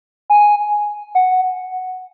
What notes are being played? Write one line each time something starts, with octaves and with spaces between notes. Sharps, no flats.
G#5
F#5